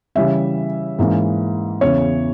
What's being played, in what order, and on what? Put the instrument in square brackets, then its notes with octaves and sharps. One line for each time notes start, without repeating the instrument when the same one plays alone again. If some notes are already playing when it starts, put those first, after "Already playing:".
[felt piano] C#3 E3 G3 C#4 E5
G#2 E3 A#3 C#4
E2 C#3 E3 C#5